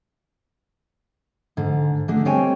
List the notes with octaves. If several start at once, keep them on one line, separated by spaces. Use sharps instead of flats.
G#2 D3
D3 G#3 A3 D4
G3 G#3 C4 C#5 G5 G#5